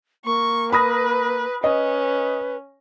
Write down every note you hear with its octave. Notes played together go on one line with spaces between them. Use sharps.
A#3 C#6
B4 B5 D#6 A#6
C#4 B4 D#5